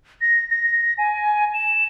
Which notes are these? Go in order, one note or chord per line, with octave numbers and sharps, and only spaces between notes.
A#6
A#6
G#5
E7